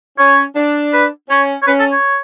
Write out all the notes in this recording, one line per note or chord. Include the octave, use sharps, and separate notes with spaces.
C#4 C#5
D4
B4
C#4 C#5
C#5
C#4 B4
A4
C#5